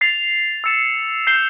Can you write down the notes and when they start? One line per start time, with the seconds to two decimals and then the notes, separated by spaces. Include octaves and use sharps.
0.01 A6 C7 F7
0.64 E6 A6 C#7 E7
1.27 G6 C7 E7 G7